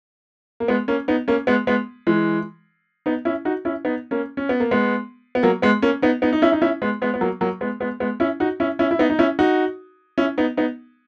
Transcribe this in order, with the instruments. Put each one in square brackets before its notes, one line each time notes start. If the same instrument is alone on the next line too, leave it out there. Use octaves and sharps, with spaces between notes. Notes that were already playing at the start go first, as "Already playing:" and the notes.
[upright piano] A#3
G#3 B3
A#3 C#4
B3 D#4
A#3 C#4
G#3 B3
G#3 B3
E3 G#3
B3 D#4
C#4 E4
D#4 F#4
C#4 E4
B3 D#4
A#3 C#4
C#4
B3
A#3
G#3 B3
B3
F#3 A#3
G#3 B3
A#3 C#4
B3 D#4
B3 D#4
D#4
C#4 E4
D#4
C#4 E4
G#3 B3
G#3 B3
B3
F#3 A#3
F#3 A#3
G#3 B3
G#3 B3
G#3 B3
C#4 E4
D#4 F#4
C#4 E4
C#4 E4
E4
B3 D#4
D#4
C#4 E4
D#4 F#4
C#4 E4
B3 D#4
B3 D#4